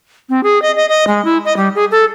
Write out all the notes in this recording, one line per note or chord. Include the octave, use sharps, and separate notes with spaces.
C4
G#4
D#5
D#5
D#5
G#3
E4
D#5
G3
G#4
A4